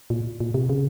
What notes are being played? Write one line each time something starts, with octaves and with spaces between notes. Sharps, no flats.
A#2
A#2
C3
C#3